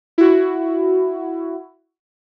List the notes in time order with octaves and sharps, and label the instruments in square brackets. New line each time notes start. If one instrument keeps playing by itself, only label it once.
[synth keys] E4 F#4